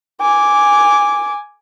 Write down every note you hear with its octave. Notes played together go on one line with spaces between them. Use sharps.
G#5 D6